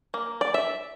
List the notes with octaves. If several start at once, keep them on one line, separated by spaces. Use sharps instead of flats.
A#3
D5
E5